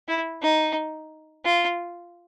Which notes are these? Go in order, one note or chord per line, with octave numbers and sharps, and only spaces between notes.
E4
D#4
F4